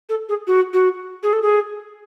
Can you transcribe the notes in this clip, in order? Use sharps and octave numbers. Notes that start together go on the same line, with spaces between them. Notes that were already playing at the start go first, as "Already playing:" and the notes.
A4
G#4
F#4
F#4
G#4
A4
G#4